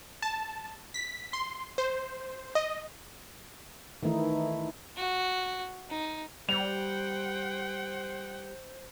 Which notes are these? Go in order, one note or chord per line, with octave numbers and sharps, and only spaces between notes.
A5
B6
C6
C5
D#5
D#3 E3 A3 D#4 E4
F#4
D#4
G3 C5 F#5 G5 F7